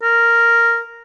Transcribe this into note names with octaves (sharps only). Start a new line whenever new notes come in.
A#4